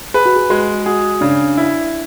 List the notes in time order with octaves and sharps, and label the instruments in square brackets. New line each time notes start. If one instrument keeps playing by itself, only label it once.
[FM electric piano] G#4 [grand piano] B4
[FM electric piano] F#4
G#4
[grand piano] G#3 [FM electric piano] F#4
[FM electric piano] F#4 [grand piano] G#4
[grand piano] C#3 [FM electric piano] D4
[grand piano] E4